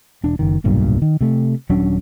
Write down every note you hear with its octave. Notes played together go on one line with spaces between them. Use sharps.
E1 D4
F#1 D#3
D1 B1 G2 A#2
D#3
C3 A3
D#1 F#3 C#4 D4